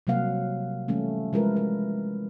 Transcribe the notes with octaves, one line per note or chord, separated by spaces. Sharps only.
C3 F#3 G3 A#3 F5 F#5
E3 G3 A3 A#3 C#4
F3 G#3 E4 A#4 B4
A#4